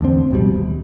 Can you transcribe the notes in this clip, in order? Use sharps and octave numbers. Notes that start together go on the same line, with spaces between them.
A1 E2 D3 C4
D1 F2 B2 G3
D#2